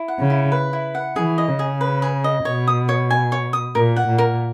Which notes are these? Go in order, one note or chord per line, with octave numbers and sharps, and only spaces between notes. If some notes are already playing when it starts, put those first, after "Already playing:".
Already playing: E4
F#5
C#3
E4
B4
E4
F#5
E3 G#4
D#5
C#3
G#4
B4
G#4
D#5
B2 C#5
D#6
C#5
G#5
C#5
D#6
A#2 A#4
F#5
A#2
A#4